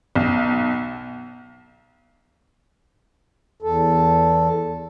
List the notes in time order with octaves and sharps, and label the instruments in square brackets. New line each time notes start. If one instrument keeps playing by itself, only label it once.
[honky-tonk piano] B1
[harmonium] E2 A4